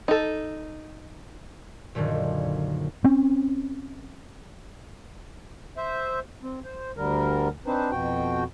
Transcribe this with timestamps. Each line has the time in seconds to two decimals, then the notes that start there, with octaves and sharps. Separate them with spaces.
0.08 D#4 A4
1.95 A#1 F#2 A#2 D3 D#3
3.04 C4 C#4
5.77 C5 E5
6.43 C4
6.64 C5
6.97 D2 D3 G3 A#4
7.66 C4 D4 D#4 B4 C5
7.91 F2 B2 F#4 G5